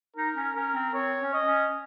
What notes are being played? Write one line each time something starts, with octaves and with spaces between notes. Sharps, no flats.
D#4 A#4
C#4
C#4 A#4
C4
C4 C#5
C#4
D#5
C#4